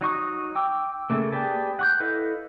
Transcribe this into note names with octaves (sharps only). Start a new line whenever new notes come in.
F#3 D#4 C#6 D#6
G5 D6 E6
C#3 A3 A#3
G4 G#4 B4 D5 A5
F#5 C#6 G6
E4 A4 B4 D#5 F5